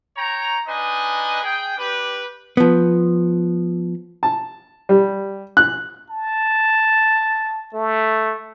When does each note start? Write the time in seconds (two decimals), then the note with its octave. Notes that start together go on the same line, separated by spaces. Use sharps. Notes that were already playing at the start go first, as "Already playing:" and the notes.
0.17 C#5 G5 A#5
0.67 D4 D#4 B4 D#5 G#5
1.43 G#4 G5
1.77 D4 G4 B4
2.57 F3 B3
4.23 A5
4.89 G3
5.57 F#6
6.10 A5
7.74 A3